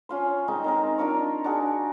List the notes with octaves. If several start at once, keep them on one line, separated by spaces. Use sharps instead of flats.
C#4 F4 C5
D#3 G#3 C4 D#4
D#3 C4 A#4
D4 F4 A#4 C#5
D4 F#4 G#4